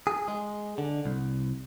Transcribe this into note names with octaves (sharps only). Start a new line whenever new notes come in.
G#4
G#3
D3
C2